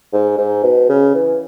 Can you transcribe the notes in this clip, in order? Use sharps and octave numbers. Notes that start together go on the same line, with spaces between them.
G#2
G#2
B2
C#3
E3